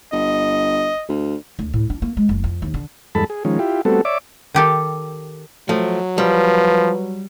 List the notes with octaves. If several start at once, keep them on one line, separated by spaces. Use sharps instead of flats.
G1 D#5
D2
D2
A2
D4
A#3
G#3
F#1
F2
D#2
D3
E2 G2 G#3 A4 A5 B5
G#4
D#3 F3 G#3 C#4
E4 F4 G4
G3 A3 B3 C4 F#4 A4
C#5 D5 E5 D6
D#3 G4 A4
F3 F#3 A3
F3 G3 B4